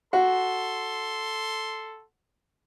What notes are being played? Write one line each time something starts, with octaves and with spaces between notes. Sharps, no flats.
F#4 A4 C6